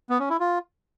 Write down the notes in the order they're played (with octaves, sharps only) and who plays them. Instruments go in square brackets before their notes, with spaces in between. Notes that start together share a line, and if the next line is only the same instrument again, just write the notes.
[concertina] B3
C#4
E4
F4